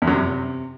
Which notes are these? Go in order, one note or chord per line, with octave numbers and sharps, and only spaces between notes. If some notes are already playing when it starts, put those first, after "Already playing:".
E2
F#2
C3